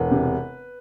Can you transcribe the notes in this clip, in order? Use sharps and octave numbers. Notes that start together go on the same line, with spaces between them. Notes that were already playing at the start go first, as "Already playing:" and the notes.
Already playing: E1 B4
C3